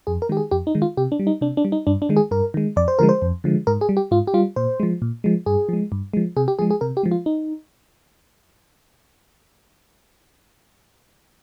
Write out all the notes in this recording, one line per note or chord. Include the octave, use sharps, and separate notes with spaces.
F2 G#4
A#4
D#3 G#3 G4
G#4
F2 G4
D#4
D#3 G#3
F4
C3 G4
D4
G3
D#4
C3 D4
D4
G3
D#4
G2 D4
D4
D#3 G#3
G#4
G2 A#4
D#3 G#3
F2 D5
C5
D3 F3 G#3 A#4
C5
F2
D3 F3 G#3
G#2 A#4
G#4
G3
G4
G#2 F4
G4
G3 F4
A#2 C5
F3 G#3
A#2
F3 G#3
G2 G#4
F3 G#3
G2
F3 G#3
C3 G#4
G4
F3 G#3 G#4
G#4
C3 A#4
G4
F3 G#3
F4
D#4